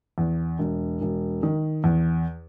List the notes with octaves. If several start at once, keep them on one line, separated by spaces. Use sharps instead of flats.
E2
E1
E1
D#3
E2